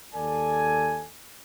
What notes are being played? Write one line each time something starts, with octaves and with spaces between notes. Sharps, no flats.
D#2 A4 D5 G#5